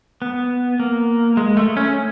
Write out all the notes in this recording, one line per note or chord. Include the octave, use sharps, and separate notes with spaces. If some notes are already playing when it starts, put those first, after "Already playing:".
B3
A#3
G#3
A3
C#4